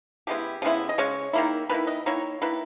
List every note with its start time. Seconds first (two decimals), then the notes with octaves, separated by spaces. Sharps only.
0.27 C#3 G#3 B3 E4 G4
0.62 C#3 G#3 B3 E4
0.89 D#5
0.98 C#3 G#3 C#5
1.33 D#3 A#3 E4
1.69 D#3 A#3 E4 B4
1.87 D#5
2.06 D#3 A#3 E4 C#5
2.42 D#3 A#3 E4 B4